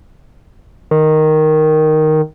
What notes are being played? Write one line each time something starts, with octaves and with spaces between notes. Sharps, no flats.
D#3